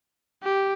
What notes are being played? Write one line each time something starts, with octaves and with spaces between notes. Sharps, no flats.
G4